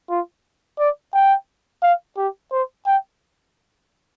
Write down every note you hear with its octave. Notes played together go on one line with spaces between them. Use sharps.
F4
D5
G5
F5
G4
C5
G5